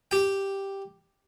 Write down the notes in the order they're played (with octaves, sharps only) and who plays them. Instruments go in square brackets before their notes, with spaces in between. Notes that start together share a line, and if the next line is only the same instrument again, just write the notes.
[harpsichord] G4 G5